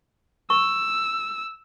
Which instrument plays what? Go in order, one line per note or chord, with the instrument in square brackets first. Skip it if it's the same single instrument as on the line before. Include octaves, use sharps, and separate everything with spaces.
[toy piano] C#6 [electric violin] E6